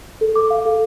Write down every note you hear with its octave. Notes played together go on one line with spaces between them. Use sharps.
A4
D6
F5
A4